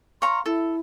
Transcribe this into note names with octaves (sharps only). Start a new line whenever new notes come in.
C#5 F5 A#5 C6
E4 A4